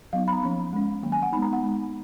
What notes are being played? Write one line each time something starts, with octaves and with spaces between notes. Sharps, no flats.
F#3 B3 D#4 F5
B5
A#5
F3 A#3 C#4 B5
G#3 C#4
D#3 F#3 A#3
G#5
F#5
G#3 B3 D#4 B5
A#5
F#5
G#3 D#4